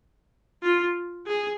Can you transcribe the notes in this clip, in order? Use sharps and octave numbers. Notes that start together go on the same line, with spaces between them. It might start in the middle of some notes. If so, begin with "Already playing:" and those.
F4
G#4